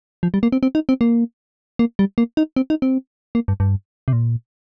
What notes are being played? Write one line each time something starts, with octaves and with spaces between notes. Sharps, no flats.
F3
G3
A#3
C4
C4
D#4
C4
A#3
A#3
G3
A#3
D#4
C4
D#4
C4
A#3
G2
G2
C3
A#2